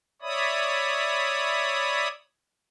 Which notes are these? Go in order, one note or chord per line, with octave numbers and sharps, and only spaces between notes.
C#5 D5 E5 B5 D#6